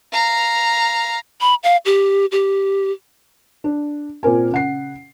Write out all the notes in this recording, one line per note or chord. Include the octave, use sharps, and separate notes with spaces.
F5 A#5
B5
F5
G4
G4
D4
A#2 C4 A#4 G#5
C#3 F#5 C7